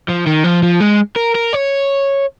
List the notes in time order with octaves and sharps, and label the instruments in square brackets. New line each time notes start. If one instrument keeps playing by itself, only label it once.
[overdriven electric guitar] F3
D#3
F3
F3
G#3
A#4
A#4
C#5